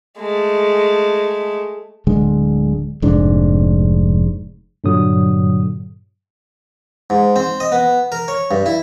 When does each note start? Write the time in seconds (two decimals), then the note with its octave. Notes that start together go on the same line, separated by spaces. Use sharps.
0.19 G#3 A3
2.07 D1 D3 G#3
3.02 F1 G#2 D4
4.84 G2 A#2 D3 F#3 D#6
7.10 G#2
7.36 C4
7.60 D#5
7.72 B3
8.12 A#4
8.28 C#5
8.51 G2
8.66 E4